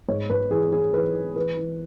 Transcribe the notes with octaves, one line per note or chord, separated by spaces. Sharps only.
G#2 C#5
G#2 B4
E3 G#4
E3 G#4
E3 B4
E3
E3 B4
E3